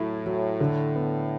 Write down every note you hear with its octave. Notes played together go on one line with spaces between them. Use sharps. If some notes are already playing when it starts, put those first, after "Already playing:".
Already playing: A2 F#3 E4
F#3
D3
B3